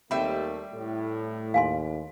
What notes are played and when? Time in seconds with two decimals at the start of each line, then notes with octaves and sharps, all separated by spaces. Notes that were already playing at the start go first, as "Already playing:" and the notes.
0.11 D#2 G3 A3 C4 E5 B5
0.73 A2
1.54 D#2 F5 G#5 C6